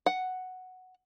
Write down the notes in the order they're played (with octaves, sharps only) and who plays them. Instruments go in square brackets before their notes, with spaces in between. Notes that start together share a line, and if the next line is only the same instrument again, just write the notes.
[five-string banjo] F#5